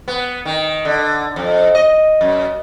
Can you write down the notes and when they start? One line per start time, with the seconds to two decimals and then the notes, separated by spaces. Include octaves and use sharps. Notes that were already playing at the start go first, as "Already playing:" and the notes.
0.08 B3
0.46 D#3
0.85 D3
1.36 F2
1.75 D#5
2.21 F#2